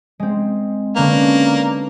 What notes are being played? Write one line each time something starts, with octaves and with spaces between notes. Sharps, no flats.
G#3 C4
D3 A#3 C#4 B4